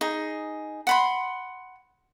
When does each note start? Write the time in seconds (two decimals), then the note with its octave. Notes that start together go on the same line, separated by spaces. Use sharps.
0.01 D#4 G#4
0.87 F#5 B5 C6